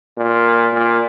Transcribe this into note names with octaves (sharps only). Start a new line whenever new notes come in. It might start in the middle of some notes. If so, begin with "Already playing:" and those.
A#2
A#2